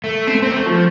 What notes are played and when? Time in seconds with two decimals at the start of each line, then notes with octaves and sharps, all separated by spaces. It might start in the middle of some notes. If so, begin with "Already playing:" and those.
0.04 A3
0.27 C4
0.35 A3
0.42 C4
0.51 A3
0.66 F3